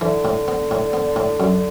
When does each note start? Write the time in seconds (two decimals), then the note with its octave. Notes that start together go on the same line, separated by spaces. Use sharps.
0.01 D3 E3
0.25 A2
0.48 B3
0.71 A2
0.93 B3
1.16 A2
1.40 F#2